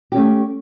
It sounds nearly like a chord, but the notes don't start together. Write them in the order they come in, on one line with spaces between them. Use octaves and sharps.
G4 C#4 A3